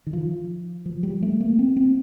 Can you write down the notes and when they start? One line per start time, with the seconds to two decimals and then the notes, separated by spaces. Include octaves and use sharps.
0.07 D#3
0.13 F3
0.86 F3
1.03 G3
1.23 A3
1.40 A#3
1.59 C4
1.76 C4